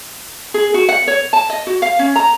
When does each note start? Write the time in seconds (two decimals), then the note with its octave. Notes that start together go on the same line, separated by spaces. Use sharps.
0.54 G#4
0.74 F#4
0.89 F#5
1.08 C#5
1.33 A5
1.50 D#5
1.67 F#4
1.82 F5
1.99 C#4
2.16 A#5